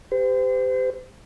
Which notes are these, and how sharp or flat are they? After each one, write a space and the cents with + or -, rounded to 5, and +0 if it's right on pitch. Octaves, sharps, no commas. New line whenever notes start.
G4 +15 C5 -40